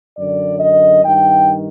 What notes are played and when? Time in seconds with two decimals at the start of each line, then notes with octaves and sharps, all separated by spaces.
0.17 F#2 D3 D5
0.59 D#5
1.03 G2 D#3 G5